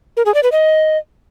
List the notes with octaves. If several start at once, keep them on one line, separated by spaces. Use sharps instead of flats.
A#4
G#4
D5
B4
D#5